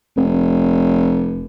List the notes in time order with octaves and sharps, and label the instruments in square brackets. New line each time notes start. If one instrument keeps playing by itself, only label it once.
[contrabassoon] F1